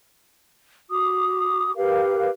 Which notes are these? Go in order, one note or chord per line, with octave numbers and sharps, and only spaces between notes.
F#4 D6 D#6
G4 A#4 B4 F5